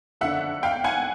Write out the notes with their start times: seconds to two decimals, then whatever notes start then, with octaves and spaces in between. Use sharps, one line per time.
0.21 F#1 F2 D3 E5 F#5
0.63 F5 G5
0.84 F#5 G#5